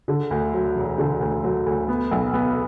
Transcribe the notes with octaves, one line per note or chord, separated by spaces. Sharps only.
D3
D2
F#3
E1
D3
D2
F#3
D2
B3
B1
B3